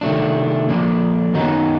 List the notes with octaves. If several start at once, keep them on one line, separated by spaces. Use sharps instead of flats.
C3 D#3 F#3 A3 D4
D3 F3 A#3 D4
F#2 D#3 F#3 B3 D#4